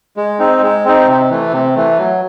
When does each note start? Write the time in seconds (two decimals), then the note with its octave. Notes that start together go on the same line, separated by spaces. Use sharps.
0.17 G#3
0.39 C4 D#4
0.62 G#3
0.85 C4 D#4
1.07 C3
1.30 E3 A3
1.52 C3
1.76 E3 A3
1.98 F#3